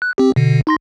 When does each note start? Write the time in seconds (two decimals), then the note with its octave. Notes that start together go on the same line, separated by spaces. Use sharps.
0.02 F#6
0.18 C4 G4
0.36 B2 D3
0.67 D#4 C6 A#6